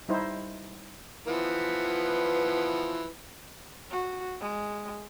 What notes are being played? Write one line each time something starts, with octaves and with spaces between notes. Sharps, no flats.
G3 D#4 E4 C5
E3 F3 B3
F#4
G#3